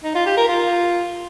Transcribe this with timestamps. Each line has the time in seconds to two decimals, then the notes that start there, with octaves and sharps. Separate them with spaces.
0.04 D#4
0.15 F4
0.26 G4
0.37 A#4
0.48 F4